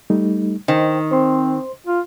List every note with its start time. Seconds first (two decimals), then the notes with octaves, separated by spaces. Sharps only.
0.10 G3 A3 D#4
0.68 D#3 C5 G5
1.11 C4 C5 C6
1.87 F4